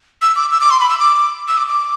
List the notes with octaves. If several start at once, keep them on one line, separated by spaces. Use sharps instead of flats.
E6
D6
E6
D6
C6
B5
E6
D6
E6
D6
D6